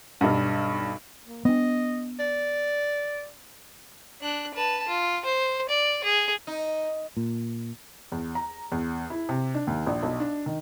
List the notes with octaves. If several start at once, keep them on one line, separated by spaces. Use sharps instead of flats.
B1 G2
A#3
B3 D4 D#5
D5
D4 F#6
B4 A5
F4
C5
D5
G#4
D#4
A#2
E2
A#5
E2
E4
C3
D4
D#2
A#1
B1
D4
D#3